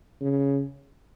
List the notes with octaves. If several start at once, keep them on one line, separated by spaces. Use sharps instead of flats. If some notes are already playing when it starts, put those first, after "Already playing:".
C#3